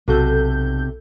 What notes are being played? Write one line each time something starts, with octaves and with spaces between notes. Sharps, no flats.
B1 C3 F#4 A4 G6